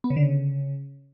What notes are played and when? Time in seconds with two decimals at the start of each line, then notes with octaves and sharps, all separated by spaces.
0.04 B3
0.10 C#3
0.16 D3
0.23 C#3